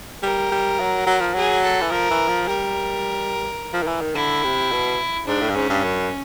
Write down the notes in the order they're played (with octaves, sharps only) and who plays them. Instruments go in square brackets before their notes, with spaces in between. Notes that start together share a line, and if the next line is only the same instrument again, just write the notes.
[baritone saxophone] G3 [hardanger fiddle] A#4
[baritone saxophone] G3
F#3
F#3
F3
[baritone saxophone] F#3 [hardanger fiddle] G#4
[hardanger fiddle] A4
[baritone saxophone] E3
[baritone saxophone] F3 [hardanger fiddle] A#4
[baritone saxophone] E3
F3
[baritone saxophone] G3 [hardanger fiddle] A#4
[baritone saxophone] F3
D#3
E3
D#3
[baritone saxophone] D3 [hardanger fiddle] E4
[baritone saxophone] C3
B2
[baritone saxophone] G#2 [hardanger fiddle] D4
[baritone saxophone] A2
G2
[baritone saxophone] G#2 [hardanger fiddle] C#4
[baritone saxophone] G2
F#2